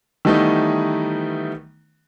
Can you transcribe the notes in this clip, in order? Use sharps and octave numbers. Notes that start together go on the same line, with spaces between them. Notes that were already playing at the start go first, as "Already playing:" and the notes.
D#3 E3 G3 A3 B3 D#4